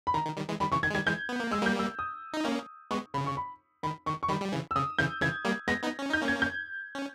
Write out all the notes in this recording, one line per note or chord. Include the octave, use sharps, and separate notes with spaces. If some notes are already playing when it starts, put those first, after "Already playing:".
B5
D#3 A#5
D#3
D#3 G3
E3 G#3
D#3 G3 B5
C#3 E3 C#6
D#3 G#6
G#3
D#3 G3 G#6
E3 G#3 G6
B3
A#3
G#3 E6
G3 A#3 G6
E6
D#6
D#4
A#3 C#4
G#3 B3 C#6
C#3 B5
C#6
B5
D#3 B5
D#3 C#6
C#6
D#3 G3 B5
G3
C#3 E3
E6
C#3 D#6
C#3 E3 G6
C#3 E3 G#6
G3 A#3
G#3 B3 A#6
B3 D#4
C#4
D#4 G6
A#3 C#4
G#6
G6
C#4